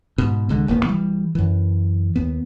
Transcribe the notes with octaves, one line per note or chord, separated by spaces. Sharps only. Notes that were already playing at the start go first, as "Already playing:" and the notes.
G#2 B2
C2 D3 G#3
E1 A1 A#3 B3
E3 G3
F#2 E3
D#2 B3